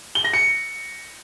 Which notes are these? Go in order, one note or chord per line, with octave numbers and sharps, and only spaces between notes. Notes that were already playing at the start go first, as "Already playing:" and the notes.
G7
A#6
C#7